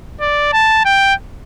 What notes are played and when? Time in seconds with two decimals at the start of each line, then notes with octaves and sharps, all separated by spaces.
0.21 D5
0.53 A5
0.85 G5